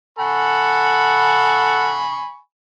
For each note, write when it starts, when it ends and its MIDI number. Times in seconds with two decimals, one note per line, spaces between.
0.19 2.08 69
0.19 2.08 78
0.19 2.38 80
0.19 2.38 83
0.19 2.38 85